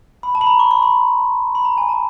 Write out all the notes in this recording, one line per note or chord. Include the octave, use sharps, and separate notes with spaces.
B5
A5
B5
A#5
C#6
C6
B5
B5
A#5
G#5
A5